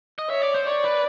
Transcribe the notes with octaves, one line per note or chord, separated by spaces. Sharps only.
D#5
C#5 E5
D5
C5
C#5 D5
B4